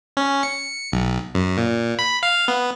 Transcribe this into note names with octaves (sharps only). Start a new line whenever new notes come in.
C#4
C#7
B1
F#2
A#2
B5
F5
B3